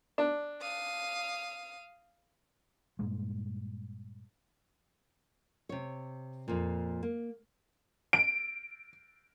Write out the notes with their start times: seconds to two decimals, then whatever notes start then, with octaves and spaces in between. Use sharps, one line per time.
0.18 D4
0.61 F5 D#6
2.99 G2 A#2 G#3
5.69 C3 C#5
6.48 F2 A#2
7.03 A#3
8.13 D7